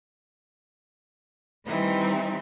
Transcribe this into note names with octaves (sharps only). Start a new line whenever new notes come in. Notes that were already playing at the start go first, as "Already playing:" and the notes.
D#3 E3 G3 C4 D#4 E4